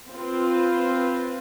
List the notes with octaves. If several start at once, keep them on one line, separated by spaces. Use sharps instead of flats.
C4 F4 B4